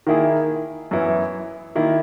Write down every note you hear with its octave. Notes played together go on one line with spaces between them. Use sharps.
D#3 A#3 E4 G#4
F#2 E3 B3 E4
D#3 A#3 E4